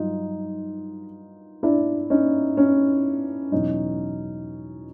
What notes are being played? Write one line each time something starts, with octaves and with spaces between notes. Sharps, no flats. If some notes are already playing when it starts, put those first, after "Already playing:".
Already playing: G2 D#3 F#3 D#4 F4
D4 E4
C#4 D#4
C#4
E2 B2 F#3 C#4 D#4